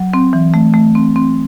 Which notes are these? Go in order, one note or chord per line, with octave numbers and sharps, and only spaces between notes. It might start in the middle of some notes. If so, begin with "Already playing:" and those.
Already playing: F#3
C4
E3
A3
A3
C4
C4